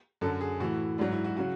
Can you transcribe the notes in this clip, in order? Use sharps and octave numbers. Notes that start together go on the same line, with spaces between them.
F#2 D3 F#3 A4
G#4
A2 E3 F#4
G#2 F#3 D4
E4
F#4
C#3 F#3 F#4